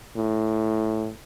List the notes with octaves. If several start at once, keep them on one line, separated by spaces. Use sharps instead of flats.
A2